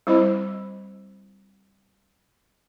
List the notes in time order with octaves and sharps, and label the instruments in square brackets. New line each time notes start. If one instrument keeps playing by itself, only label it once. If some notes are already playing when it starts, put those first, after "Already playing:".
[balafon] G3 C4 E4 C5 D#5 B5